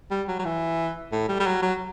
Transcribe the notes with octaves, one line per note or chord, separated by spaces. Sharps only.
G3
F#3
F#3
E3
A2
G3
G3
F#3
F#3